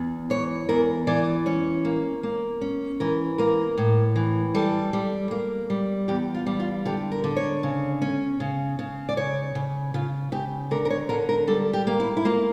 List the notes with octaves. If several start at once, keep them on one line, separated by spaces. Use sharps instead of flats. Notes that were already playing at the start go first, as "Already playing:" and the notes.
Already playing: E2
E3 C#5
E2 A#4
E3 D5
C#4 C#5
A#3
A#3
C#4
E3 A#4
A#3 A#4
A2
E3
G3 A4
G3
A#3
G3
E2 G4
F4
G3
F4
D3 G4
A#4
D3
C#5
C#3
C#4
C#3
C#3
D5
C#3 C#5
C#3
C#3 F4
C#3 G4
D3 A#4
A#4
C#5
D3 A#4
A#4
G3 A4
G4
A#3
E4
E4
A#3 F4